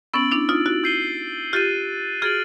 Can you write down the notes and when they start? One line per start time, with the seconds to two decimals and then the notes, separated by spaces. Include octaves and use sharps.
0.14 B3 C#4 E6 A6 D7 F#7
0.31 D4 E4
0.49 D#4 F4
0.66 E4 F#4
0.84 E6 G6 C7 D#7 G7
1.53 F4 G4 F#6 A6 C7 D#7
2.22 F#4 G#4 F6 A6 D7 F#7